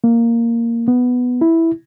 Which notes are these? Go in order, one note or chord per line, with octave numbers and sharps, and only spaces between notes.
A#3
B3
E4